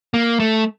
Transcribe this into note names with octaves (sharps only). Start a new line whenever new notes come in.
A#3
A3